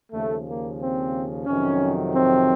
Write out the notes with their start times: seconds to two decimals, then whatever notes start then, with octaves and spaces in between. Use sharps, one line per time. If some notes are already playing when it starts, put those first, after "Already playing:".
0.12 D#2 C#3 F3 A3
0.46 A#3
0.79 C4
1.46 F2 C3 D#3 F#3 C#4
2.13 C4